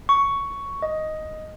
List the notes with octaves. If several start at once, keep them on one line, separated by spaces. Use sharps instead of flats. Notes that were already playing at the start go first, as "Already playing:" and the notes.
C#6
D#5